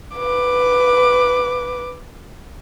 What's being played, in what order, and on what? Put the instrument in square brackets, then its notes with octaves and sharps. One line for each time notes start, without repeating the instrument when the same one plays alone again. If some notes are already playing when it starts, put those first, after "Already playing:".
[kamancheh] B4 D6